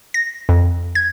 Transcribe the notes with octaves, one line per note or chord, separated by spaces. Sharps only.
A#6
F2
G#6